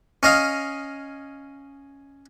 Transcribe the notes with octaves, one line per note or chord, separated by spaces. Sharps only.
C#4 D#5 F5